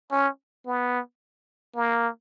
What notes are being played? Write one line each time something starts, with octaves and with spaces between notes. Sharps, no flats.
C#4
B3
A#3